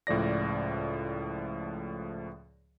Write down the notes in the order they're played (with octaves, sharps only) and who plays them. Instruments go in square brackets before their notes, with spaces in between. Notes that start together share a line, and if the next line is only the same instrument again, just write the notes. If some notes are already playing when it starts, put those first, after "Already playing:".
[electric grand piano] C#2 A2 F3 D5 A#6